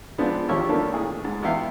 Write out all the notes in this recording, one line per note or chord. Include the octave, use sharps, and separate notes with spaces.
F3 G#3 B3 C4 D4
D#2 F3 G4 C#5 E6
D#3 A#3 B3 D4 A4
A2 G#4
G#2
E2 B3 E4 E5 F5 G5